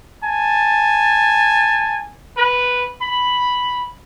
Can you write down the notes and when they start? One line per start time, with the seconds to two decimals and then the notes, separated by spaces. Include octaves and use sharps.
0.24 G#5 A5
2.38 B4
3.02 B5